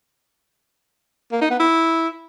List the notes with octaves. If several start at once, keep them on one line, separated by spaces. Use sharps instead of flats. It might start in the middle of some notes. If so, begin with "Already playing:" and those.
A#3
D#4
B3
E4